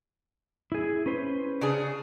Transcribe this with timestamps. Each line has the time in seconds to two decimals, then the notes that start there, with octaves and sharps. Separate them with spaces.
0.72 E4 G#4
1.06 C#4 B4 C5
1.61 C#3 D4 G#4